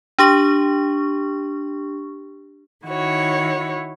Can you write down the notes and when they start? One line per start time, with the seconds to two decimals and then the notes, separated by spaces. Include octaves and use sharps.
0.19 D4 G4 C#6
2.85 D#3 E4 F#4 C#5